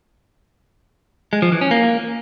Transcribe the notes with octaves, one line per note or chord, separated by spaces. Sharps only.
G#3
F3
E3
C#4
A#3